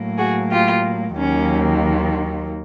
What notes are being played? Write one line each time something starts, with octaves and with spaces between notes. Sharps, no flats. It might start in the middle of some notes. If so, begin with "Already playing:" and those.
Already playing: A2 F#3 A#3
F#4 G#4
F4 G4
D#2 D#3 F#3 A#3 C#4